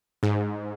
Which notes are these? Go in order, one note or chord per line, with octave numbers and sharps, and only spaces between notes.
G#2